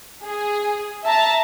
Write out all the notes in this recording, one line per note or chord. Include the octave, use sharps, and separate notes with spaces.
G#4
E5 A5 A#5